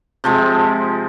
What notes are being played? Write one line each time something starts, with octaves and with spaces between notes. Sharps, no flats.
C3 F3 G#3